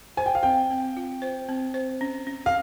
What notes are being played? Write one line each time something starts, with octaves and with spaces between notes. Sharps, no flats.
C5 G#5
G5
F5
C4 G5
C4
F4
C5
C4
C5
C#4
C#4
F5